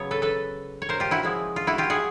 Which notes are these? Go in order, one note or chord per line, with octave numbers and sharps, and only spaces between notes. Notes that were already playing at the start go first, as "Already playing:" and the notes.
Already playing: C#3 F#3 B3 C#5
A4 B4
A4 B4
C#5
A#4 C5
F4 G4
E4 F#4
F3 G#3 C#4 E4
F4
E4 F#4
F4 G4
F#4 G#4